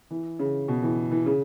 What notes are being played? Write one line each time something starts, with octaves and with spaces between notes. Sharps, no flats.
E3
C#3
B2
E3
E3
C#3